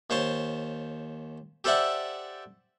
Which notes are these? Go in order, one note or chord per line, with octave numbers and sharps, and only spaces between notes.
D#2 C5 C#5 A5 C6
G4 A4 C5 D5 E5 F#5